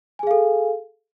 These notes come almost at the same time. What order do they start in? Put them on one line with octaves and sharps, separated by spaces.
G#5 G#4 F5 A4